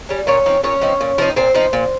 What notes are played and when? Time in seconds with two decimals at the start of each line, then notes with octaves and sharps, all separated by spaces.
0.09 G3 C#4
0.27 A#2 C#4 C#5
0.46 F3 C4 D#4
0.64 A#2 C#4 C#5
0.81 F3 C4 D#4
1.01 A#2
1.18 F3 C4 D#4
1.36 A#2 C4 C5
1.54 F3 C4 D#4
1.73 A#2